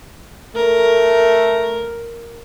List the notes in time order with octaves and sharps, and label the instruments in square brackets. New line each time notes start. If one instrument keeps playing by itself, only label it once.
[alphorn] A3 [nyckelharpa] A#4